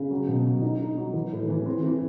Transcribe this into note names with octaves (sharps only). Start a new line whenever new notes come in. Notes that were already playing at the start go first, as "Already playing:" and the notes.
Already playing: C#3
F#3
B2
F#3
D#4
D#4
F#3
E3
A2
E3
C4
E3